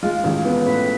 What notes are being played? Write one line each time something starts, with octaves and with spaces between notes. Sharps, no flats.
G#3 F4
A1
B3
A2 B4